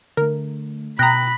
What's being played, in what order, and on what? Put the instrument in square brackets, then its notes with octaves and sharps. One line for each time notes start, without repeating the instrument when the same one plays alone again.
[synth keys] D3 A3 [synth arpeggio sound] A#4
[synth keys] B2 D#6 [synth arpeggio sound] G5 A#5 [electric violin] B5 [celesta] F#6 A#6